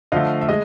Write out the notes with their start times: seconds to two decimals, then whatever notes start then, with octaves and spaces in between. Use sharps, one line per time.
0.12 D3 F3 A3 D#5 F5
0.41 E5
0.49 G#3 D#5